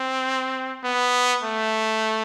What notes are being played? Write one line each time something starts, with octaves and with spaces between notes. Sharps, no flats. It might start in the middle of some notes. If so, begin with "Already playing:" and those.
Already playing: C4
B3
A3